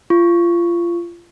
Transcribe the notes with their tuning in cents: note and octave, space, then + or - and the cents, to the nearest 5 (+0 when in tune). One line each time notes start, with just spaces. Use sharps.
F4 -25 C#6 +0